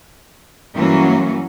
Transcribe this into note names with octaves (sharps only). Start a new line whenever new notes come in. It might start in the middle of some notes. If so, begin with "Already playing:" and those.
G2 E3 F#3 A#3 C#4 F#4